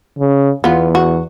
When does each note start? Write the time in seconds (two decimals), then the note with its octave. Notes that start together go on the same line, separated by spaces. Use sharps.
0.19 C#3
0.64 E2 B3 F4
0.95 F#4